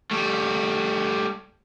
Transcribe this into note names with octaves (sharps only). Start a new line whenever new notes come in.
G3 A3